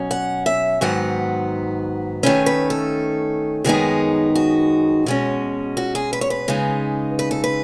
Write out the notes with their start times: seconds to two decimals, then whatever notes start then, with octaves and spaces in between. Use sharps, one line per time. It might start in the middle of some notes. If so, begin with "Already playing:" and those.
Already playing: B2 F#3 C#4
0.11 F#5
0.46 E5
0.81 G#2 D#3 F#3 B3 F#5
2.23 D#3 A3 C#4 B4
2.46 B4
2.70 A4
3.64 F#2 D#3 G#3 B3 D#4 G#4
4.35 F#4
5.06 B2 G#3 C#4
5.77 F#4
5.95 G#4
6.13 B4
6.21 C#5
6.30 B4
6.48 C#3 G#3 D#4
7.19 B4
7.31 A4
7.44 B4